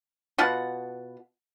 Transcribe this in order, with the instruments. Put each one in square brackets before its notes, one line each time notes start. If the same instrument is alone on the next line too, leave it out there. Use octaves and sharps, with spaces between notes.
[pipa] B2 F4 F#5